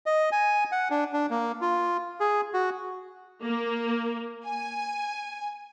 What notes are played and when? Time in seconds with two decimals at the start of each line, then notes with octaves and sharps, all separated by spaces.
0.06 D#5
0.32 G#5
0.72 F#5
0.90 D4
1.13 D4
1.30 A#3
1.61 F4
2.20 G#4
2.53 F#4
3.42 A#3
4.44 G#5